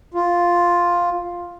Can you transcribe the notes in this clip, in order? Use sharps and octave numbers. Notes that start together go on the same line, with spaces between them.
F4